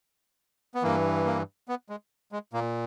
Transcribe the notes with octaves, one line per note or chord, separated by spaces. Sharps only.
B3
G2 E3 A#3
A#3
B3
G#3
G#3
A#2 A#3